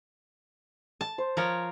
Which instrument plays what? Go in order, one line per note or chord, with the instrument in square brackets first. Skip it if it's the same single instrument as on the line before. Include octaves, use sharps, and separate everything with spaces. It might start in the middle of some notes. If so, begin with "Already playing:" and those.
[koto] A5
[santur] C5
[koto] F3 A#4 C#5